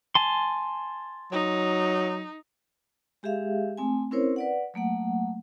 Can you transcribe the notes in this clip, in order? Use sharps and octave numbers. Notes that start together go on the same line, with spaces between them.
G#5 A5 C6
F#3 D#4
G#3 G4 G#4 E5 F5
A3 C4 G#5
C4 C#4 E4 A#4 C5 C#5
B4 D5 F#5
F#3 A3 A#3 F#5